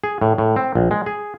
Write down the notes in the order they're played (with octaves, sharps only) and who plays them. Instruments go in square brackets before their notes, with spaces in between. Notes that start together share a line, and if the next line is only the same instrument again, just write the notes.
[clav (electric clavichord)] G#4
A2
A2
C4
A#1
G#3
G#4